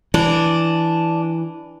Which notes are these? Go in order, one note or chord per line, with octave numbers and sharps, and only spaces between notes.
E3 D4